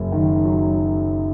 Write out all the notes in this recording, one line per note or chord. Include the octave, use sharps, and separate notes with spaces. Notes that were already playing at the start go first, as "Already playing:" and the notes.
Already playing: F#1 F#2 F#3
D#3
F#3